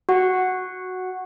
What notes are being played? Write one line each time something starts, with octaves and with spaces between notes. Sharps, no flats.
F#4 F#5